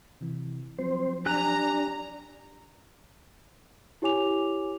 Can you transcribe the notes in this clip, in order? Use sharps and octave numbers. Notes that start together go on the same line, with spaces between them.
C3 E3
F3 F#3 C4 C5
D4 G4 G#5 A#5 F#6
E4 G4 C#5 G#5 D6 F7